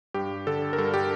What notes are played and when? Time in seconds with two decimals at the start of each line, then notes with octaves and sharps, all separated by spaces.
0.14 G2 G4
0.47 D3 A4
0.73 A#4
0.78 G2 A4
0.94 G4